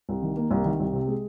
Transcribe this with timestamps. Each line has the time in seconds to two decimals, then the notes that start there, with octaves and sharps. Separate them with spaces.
0.09 C2
0.22 D#3
0.37 A#3
0.51 C2
0.65 D#3
0.80 C2
0.93 C3
1.07 G#3